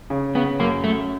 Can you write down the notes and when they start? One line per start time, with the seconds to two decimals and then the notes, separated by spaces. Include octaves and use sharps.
0.10 C#3
0.35 C#3 B3
0.60 F#2 A#3
0.84 F#2 A3